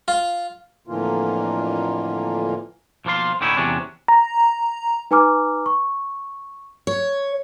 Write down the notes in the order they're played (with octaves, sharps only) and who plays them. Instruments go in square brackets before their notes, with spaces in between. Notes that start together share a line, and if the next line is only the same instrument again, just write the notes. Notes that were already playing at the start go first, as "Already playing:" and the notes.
[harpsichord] F4
[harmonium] F2 A2 D3 E3 A#3 F4
[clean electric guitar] B1 F3 A#3 F4 C6
A2 D3 C#4 D#4 E4
E2 C3 F#3 C#4 D4
[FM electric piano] A#5
[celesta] D#4 B4 G#5 A#5 D6 F6
C#6
[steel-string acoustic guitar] C#5